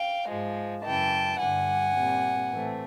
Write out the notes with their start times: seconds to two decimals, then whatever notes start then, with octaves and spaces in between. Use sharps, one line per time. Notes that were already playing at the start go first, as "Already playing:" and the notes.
Already playing: F5 G5
0.28 G#2 F3 G#3
0.84 F#2 C#3 E3 G5 A5
1.39 G2 D3 G3 F#5 G#5
1.94 A#2 G3 C4
2.50 A2 E3 A3 C4